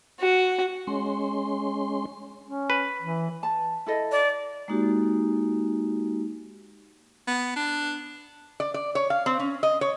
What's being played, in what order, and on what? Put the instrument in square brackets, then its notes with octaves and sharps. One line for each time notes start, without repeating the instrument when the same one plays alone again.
[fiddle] F#4
[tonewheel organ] G#3 C#4 C6
[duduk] C#4
[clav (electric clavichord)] B4
[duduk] E3
[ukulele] A5
E4 A4 D#5
[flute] D5
[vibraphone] G#3 A#3 D#4 F#4 G4
[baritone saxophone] B3
D4
[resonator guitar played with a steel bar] D5
D5
C#5
F5
C4
C#4
D#5
C#5